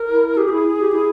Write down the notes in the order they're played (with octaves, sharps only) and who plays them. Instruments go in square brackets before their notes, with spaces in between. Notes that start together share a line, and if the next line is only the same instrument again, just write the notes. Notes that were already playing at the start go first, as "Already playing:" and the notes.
Already playing: [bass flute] A#4
[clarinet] E4
[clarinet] G4 [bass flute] G#4
[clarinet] G4
E4
E4
G4
E4